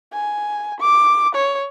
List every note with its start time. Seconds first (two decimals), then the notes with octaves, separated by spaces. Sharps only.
0.13 G#5
0.80 D6
1.35 C#5